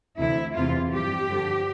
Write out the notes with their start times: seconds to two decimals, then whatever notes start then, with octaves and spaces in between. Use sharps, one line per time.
0.19 D2 C3 E3 E4
0.55 E2 C3 E3 F4
0.93 G2 F3 G4
1.29 G2 D3 F3